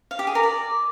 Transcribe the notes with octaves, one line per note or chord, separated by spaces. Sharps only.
F5
G4
G#4
A#4
D5